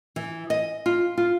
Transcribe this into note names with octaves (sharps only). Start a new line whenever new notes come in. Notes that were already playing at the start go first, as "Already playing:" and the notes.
E3
D#5
F4
F4